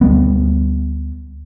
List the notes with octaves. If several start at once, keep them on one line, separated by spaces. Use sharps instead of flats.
D2 G3 B3